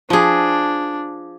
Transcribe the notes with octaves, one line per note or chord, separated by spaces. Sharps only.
F3 D4 G#4